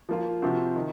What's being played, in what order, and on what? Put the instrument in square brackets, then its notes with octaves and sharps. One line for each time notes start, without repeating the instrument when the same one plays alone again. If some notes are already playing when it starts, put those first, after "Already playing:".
[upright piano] F3 A#3 F4
C3 F3 C4 F#4
D#3